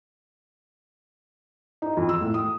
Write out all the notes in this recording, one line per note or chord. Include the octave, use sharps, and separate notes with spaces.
D#4
F2
E6
A2
D#6